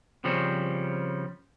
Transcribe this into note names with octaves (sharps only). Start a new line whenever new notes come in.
C#3 F3 G3 C4 C#4